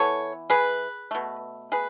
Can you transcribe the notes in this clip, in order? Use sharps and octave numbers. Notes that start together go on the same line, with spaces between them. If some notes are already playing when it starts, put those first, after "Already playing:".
Already playing: E3 B3 A4 C#5
G#4 B4
B2 A3
G#4 B4